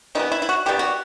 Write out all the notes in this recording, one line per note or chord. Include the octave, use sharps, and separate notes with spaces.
C3 E3 G3 B3 D#4
E4
E4
F#4
C3 E3 G3 B3 G4
F#4